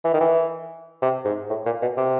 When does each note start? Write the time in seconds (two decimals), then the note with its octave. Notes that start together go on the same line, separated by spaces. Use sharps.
0.04 E3
0.13 D#3
0.20 E3
1.02 C3
1.25 G#2
1.50 A2
1.65 A#2
1.82 B2
1.97 C3